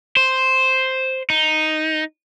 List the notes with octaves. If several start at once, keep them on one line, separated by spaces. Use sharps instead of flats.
C5
D#4